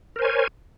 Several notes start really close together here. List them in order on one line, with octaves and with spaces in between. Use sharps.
A#4 C5 G#5 C#5